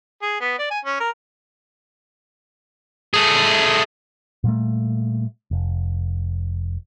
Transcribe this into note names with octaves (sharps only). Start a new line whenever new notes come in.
G#4
B3
D5
G#5
C#4
A#4
A3 G#4
A#2 G3 A3
F1